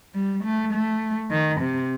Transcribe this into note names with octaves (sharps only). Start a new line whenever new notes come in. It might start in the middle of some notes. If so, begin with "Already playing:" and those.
G3
A3
A3
D#3
C3